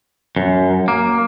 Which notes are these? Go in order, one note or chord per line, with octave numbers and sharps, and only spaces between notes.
F#2
A#3